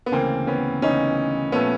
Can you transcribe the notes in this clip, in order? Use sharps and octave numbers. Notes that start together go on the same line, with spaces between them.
B3
D2 C#3 E3 A#3 C4
B3 C#4
D2 C#3 E3 C#4 D#4
A#2 F3 A3 B3 C#4